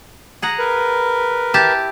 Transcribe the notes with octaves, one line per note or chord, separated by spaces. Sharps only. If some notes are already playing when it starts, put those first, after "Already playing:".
G#4 F#5 A#5
A#4 B4
E4 G4 A5